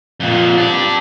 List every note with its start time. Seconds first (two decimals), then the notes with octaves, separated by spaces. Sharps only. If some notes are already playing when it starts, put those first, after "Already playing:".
0.20 F2 A#2
0.57 D4 G4